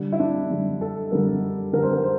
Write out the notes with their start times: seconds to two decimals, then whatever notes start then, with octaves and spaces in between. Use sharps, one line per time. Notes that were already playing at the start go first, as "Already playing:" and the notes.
Already playing: D3 G3
0.12 E4
0.20 D4
0.50 D3 G3
0.81 A4
1.12 D3 G3 A#4
1.73 D3 G3 A#4
1.83 C5
1.93 A#4
2.03 C5